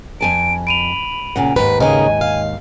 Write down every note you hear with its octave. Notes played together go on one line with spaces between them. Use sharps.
F2 G#5 A5 D7
B5 D7 D#7 F7
A#2 C#3 F#5
D#2 G#2 B4
C#3 A#3 D#4 D#5 G#5
F5